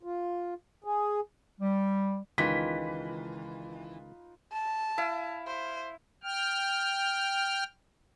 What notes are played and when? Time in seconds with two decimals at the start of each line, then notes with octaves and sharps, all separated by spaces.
0.03 F4
0.84 G#4
1.60 G3
2.38 C#2 D#3 E3 D#4 F4 B4 B6
4.52 A5
4.98 E4 F5
5.47 C5
6.23 G5 F6